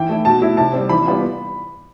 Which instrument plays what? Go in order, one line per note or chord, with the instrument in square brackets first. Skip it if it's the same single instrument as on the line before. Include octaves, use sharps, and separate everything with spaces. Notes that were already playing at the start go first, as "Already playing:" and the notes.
Already playing: [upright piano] E3 G5
A3 E4
B2 A5
A3 E4
C3 A5
G3 C4
E3 B5
G3 B3 F4